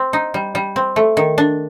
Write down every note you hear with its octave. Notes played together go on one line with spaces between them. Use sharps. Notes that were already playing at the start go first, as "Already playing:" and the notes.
Already playing: C4
D#4
G3
G3
C4
A3
D#3
D4